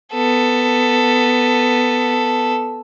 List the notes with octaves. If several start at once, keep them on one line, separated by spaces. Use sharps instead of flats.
B3 A4